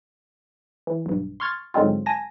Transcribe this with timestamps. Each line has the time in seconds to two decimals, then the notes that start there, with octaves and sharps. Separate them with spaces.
0.87 E3
1.06 B1 G2
1.40 C6 C#6 F6 G#6 A6
1.74 G#2 D3 F#3 G#3 C4 F4
2.06 G#5 A5 A#6